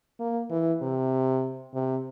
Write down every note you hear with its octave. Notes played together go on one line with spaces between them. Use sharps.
A#3
E3
C3
C3